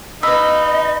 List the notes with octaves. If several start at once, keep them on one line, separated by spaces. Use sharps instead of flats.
D#4 B4 D#5 F5 B5 E6